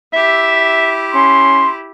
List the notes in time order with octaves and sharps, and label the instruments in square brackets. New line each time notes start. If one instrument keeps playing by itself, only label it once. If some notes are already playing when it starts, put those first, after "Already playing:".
[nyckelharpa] E4 G4 [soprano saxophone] E5
[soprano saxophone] C#4 [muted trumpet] C6